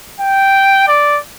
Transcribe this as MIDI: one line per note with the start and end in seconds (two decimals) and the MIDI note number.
0.20 0.87 79
0.88 1.19 74